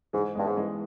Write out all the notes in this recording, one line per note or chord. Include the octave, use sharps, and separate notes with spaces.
G#2 E3 G#3
G#3 B3
G2
G#2
E3 G#3